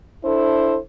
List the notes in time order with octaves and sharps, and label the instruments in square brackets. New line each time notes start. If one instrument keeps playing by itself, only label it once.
[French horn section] D4 E4 A4 C5